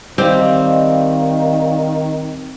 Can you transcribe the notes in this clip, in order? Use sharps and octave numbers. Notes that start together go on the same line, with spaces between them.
D#3 G3 C4 D5 D#5 F5